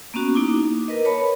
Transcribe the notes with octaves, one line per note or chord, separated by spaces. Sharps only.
A#3 B3 C#4 F#4
A#3 D#4 E4 D6
A#4 B4 D#5
B4 C#5 A5 B5
A#4